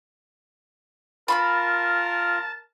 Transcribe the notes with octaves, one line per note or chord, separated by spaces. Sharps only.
F4 A#4 A5 B5 C6 F6